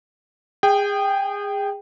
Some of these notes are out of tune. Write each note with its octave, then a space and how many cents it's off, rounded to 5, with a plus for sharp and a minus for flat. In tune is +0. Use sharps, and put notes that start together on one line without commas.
G#4 -25 G5 +0